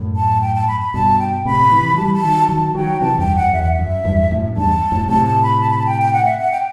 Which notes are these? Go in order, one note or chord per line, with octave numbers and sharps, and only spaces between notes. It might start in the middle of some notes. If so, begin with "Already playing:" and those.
Already playing: F#2 A2
A5
G5
A5
B5
B5
G2 B2 A5
G5
A2 C3 B5
C3 E3
F#3
E3 G3 A5
B5
A5
D#3 F#3
D#3 F#3 A5
D#3 F#3 G5
C3 E3 A5
E2 G2 G5
F#2 F#5
E2 E5
F#5
E5
F#2
E2 G2
F#2 A2
E2 G2 A5
F#2 A2
A2 C3 A5
A5
B5
A5
B5
A5
G5
G5
F#5
E5
F#5
G5